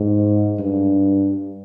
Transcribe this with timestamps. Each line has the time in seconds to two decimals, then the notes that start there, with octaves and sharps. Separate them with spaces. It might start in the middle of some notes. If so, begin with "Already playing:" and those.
Already playing: G#2
0.59 G2